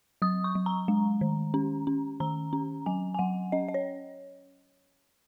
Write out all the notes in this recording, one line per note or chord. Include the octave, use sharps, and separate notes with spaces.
F#3 D#6
C#6
F#3
A#5
G#3
D#3
C#4
C#4
D#3 A#5
C#4
F#3 G#5
G#5
F#3 F#5
C#4 D#5
D#5
C#5